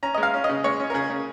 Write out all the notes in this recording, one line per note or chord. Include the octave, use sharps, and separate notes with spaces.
C#4 A#5
G#3 D#5
F5
C#4
D#5
C#3
G#3 C#5
C#4
A#4
C#3 G#4
C#3